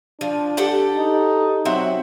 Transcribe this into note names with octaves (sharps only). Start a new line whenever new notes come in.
F3 D4
G4 A4 F#5
D#4
F#3 C4 F#4 E5